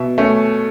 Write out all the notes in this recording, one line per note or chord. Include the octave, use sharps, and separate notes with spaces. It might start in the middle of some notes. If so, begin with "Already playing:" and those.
Already playing: B2 E5
A3 C#4